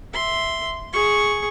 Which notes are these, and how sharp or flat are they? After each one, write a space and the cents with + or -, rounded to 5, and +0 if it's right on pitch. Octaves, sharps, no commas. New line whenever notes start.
E5 +0 C6 +0
G#4 +5 C#6 +0